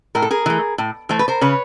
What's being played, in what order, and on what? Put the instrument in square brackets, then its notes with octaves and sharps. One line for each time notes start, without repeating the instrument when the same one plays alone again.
[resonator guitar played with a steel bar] A2 A#4
A4
G#4 A#4
E3 A3
A2
E3 A3 C5
B4
A#4 C5
C#3 B4 C#5